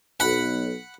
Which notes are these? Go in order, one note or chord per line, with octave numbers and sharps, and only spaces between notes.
B1 F#5 B5